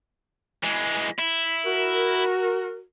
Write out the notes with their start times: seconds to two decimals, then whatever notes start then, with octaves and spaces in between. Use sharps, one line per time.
0.64 E3 G#3
1.18 E4
1.64 F#4 A#4